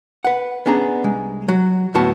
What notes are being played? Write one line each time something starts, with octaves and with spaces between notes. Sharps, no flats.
B4 F#5
B3 C#4 D4 G#4 A#5
C2 G#3
F#3 F#4
D2 A2 B3 F#4 A5